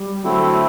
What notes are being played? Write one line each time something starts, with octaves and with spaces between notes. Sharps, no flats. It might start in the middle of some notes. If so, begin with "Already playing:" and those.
Already playing: G3
D3 F#3 A3 C4 E4